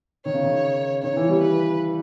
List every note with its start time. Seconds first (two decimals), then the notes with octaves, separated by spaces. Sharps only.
0.25 D#3 C#5
0.34 C#3
0.43 D#3
1.02 D#3 C#5
1.16 E3
1.29 G3
1.41 B4